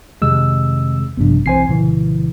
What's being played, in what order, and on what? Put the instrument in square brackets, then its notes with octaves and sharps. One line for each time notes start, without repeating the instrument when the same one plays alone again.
[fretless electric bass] F2 C3 D#3 [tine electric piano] G#3 E6
[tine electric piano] A1 G2 D4 [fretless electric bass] C3 F3 B3
[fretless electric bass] B1 E3 C4 [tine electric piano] C5 G#5 C7
[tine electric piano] C2 E3 [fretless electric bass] A#2 C#3